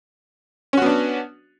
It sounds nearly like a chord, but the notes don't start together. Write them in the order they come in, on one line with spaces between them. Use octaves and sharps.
C#4 F#4 B3 D4